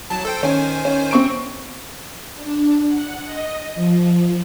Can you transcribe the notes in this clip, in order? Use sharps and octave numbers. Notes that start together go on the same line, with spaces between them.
C2 F#3 A5
A4 C5 G5
D#3 C#4 C5 G#5
C#4
C4 C#6 D7
D4
F#5
D#5
F3